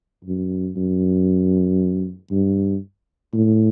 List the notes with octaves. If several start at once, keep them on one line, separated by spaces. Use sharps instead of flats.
F#2
F#2
G2
A2